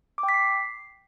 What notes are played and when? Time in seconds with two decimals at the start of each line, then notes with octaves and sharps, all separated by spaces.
0.18 D6
0.23 G5
0.29 B6
0.34 C7